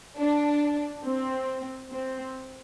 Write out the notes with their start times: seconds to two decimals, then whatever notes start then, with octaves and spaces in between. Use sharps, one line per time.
0.19 D4
1.05 C4
1.92 C4